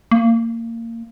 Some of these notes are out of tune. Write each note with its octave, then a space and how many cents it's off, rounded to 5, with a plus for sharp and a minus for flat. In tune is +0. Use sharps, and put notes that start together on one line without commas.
A#3 -25